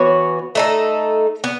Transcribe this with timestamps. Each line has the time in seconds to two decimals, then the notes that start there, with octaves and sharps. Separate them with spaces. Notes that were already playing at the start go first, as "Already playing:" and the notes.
Already playing: E3 B3 F#4 C#5
0.55 A3 D#4 A4
1.44 B3